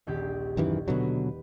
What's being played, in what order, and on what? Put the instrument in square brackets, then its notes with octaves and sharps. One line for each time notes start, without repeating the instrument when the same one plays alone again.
[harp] D#1 A#1 G4
[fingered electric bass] F#2 D#3 E3
[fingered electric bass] B2 D3 F#3 [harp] B4